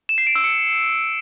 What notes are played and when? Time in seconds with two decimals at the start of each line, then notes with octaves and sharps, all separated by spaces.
0.09 E7
0.18 C7
0.27 D7
0.35 E6
0.44 C#7